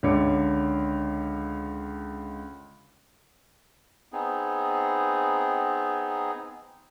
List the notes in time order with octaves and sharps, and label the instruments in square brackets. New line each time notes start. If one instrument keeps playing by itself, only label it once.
[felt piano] C#2 D3 C#5 D6 C#7
[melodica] B3 C4 D#4 G#4